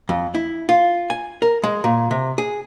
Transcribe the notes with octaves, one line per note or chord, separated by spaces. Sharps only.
F2
E4
F4
G#5
A#4
G#3
A#2
C3
G#4